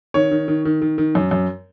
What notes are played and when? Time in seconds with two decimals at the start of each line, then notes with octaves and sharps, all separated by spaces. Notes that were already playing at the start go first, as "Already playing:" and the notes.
0.14 D#3 C#5
0.31 D#3
0.48 D#3
0.65 D#3
0.82 D#3
0.98 D#3
1.15 F#2
1.31 F#2